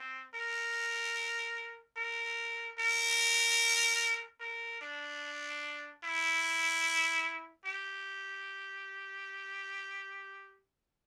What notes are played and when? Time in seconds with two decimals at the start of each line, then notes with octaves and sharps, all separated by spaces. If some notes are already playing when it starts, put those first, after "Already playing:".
Already playing: C4
0.34 A#4
1.97 A#4
2.78 A#4
4.40 A#4
4.81 D4
6.04 E4
7.66 G4